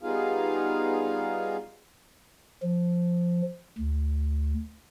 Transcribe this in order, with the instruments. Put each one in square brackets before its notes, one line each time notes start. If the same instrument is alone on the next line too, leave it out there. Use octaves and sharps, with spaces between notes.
[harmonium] G3 B3 D#4 F4 G#4 F5
[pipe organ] F3
D2